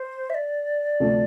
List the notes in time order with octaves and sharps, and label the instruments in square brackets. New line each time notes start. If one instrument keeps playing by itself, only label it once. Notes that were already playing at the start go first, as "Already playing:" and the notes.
Already playing: [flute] C5
E5
D5
[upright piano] D2 C3 F3 A3